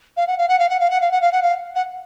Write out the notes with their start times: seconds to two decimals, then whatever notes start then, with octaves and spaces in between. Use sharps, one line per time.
0.16 F5
0.27 F#5
0.38 F5
0.48 F#5
0.59 F5
0.69 F#5
0.79 F5
0.90 F#5
1.00 F5
1.11 F#5
1.21 F5
1.32 F#5
1.42 F5
1.75 F#5